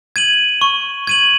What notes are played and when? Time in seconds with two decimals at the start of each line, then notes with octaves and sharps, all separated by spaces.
0.16 G#6 D#7 F#7
0.61 C#6
1.07 G#6 D#7 F#7